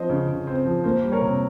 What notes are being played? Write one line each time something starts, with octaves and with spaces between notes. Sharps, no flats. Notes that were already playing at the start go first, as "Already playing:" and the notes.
Already playing: F3 C4 C5 D#5
C#3
C#3
C4
F3
A#3 C5
G3
A#4 C#5
C3